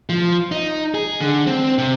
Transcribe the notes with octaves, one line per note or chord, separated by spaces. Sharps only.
F3
D#4
G#4
D3
C4
C3